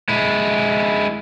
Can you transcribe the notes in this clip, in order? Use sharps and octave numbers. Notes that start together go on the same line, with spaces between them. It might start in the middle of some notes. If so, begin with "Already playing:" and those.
G#3 E4